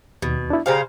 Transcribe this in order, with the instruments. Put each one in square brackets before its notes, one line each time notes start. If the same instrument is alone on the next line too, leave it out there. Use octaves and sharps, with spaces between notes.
[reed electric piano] D#2 [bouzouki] B2
[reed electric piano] D4 E4
[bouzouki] C#3 C5 F5 [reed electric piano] G4 G#5 A#5